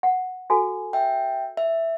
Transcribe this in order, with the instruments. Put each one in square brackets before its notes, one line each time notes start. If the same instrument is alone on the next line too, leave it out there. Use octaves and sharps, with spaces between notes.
[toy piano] F#5
F#4 A4 G#5
[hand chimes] E5 G5
E5